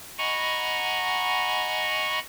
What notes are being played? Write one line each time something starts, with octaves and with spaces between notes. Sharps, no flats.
D#5 F#5 G#5 A#5 B5 C#6